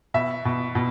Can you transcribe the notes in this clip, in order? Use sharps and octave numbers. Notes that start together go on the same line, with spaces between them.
B2 E5
B2
B2